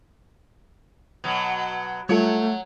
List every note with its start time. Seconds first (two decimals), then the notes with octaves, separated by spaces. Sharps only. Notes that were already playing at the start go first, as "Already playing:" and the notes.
1.24 B2 F#3
2.09 F#3 G3 A3 F4 A4 C#5